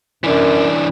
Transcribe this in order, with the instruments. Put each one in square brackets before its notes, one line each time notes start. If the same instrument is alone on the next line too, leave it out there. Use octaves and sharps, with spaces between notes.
[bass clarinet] F#2 [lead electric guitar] E3 D4